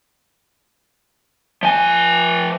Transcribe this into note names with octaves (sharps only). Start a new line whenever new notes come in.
F3 G#5